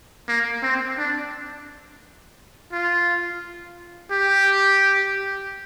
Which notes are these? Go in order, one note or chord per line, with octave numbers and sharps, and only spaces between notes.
A#3
C4
D4
F4
G4